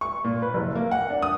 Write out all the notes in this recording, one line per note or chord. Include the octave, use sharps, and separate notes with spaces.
C#6
A#2
B4
F#1
A#3
F#5
D4
D#6